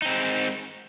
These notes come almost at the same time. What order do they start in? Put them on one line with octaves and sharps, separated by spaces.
D#4 C4 G#3